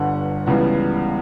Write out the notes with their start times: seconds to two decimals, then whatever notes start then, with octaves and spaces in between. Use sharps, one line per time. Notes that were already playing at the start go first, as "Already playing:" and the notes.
Already playing: G1 G2 D3 F#5
0.46 C#2 C#3 E3 G3 B3 F#5